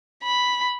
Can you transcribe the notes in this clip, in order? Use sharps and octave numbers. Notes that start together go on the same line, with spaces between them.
B5